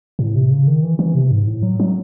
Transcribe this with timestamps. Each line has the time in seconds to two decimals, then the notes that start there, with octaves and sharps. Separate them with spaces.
0.19 A2
0.35 C3
0.51 C#3
0.67 D#3
0.83 E3
0.99 E3
1.15 C3
1.31 G#2
1.46 A2
1.63 F#3
1.80 F#3